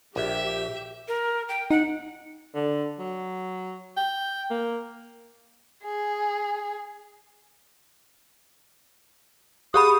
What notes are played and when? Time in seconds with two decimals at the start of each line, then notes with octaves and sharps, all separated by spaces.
0.16 A#1 G4 E5
1.08 A#4
1.49 G5
1.71 D#4 F#5
2.55 D3
2.99 F#3
3.97 G5
4.51 A#3
5.84 G#4
9.74 G4 G#4 B5 D#6